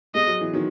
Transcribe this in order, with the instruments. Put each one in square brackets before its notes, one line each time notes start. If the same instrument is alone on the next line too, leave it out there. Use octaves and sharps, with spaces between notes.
[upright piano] G#3 [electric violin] D#5
[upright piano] F#3
E3
D#3 F#3